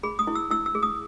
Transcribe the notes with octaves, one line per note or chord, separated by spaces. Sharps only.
G#4 B5
D#6
E4
E6
E4 E6
E6
G#4
D#6